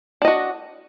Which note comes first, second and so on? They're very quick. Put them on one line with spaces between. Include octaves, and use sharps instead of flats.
D4 D#5 F#4